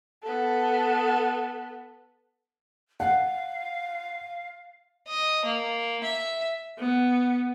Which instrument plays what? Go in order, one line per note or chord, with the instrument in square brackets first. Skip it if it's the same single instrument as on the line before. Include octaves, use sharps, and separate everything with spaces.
[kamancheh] B3 A4
[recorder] F5 [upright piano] F#5
[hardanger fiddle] D#5
A#3
E5
[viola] B3